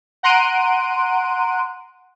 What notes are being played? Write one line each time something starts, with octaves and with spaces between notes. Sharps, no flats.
F#5 A#5 C6 F#6 D7 D#7